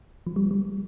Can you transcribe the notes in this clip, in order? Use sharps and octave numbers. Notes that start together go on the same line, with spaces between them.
F3
G3
G3